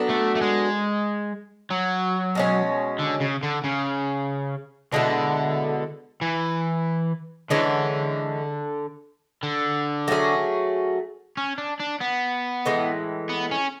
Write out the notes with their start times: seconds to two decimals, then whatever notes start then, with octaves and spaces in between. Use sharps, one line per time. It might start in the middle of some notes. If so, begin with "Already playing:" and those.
Already playing: F#3 B3 D4 A4
0.09 A3
0.35 A3
0.41 G#3
1.70 F#3
2.35 B2 G#3 C#4
2.99 D3
3.21 C#3
3.43 D3
3.64 C#3
4.92 B2 D3 G#3 B3 E4
6.22 E3
7.50 D3 E3 G#3 C#4
9.43 D3
10.08 F#3 A3 C#4 G#4
11.37 C#4
11.58 D4
11.80 D4
12.01 B3
12.66 A2 E3 G#3
13.29 B3
13.51 C#4